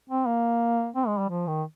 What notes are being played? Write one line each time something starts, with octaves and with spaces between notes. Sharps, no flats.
C4
A#3
C4
G#3
G3
F3
D#3